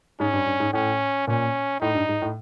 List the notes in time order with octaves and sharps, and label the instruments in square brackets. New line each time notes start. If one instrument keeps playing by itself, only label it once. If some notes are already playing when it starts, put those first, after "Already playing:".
[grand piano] G#2 [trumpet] C#4
[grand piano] G2
G2
G#2
[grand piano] A2 [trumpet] C#4
[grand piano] A#2 [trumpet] C#4
[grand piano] A2 [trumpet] D#4
[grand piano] G2
G#2
A2